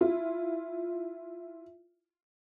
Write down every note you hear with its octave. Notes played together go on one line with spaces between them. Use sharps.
E4 F4